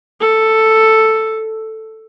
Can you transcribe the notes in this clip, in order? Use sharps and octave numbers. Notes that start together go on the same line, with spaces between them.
A4